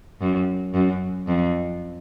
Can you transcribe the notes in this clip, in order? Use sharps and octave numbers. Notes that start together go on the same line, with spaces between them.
F#2
F#2
F2